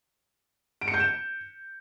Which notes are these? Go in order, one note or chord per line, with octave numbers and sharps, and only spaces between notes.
D7
C#7
G6
E7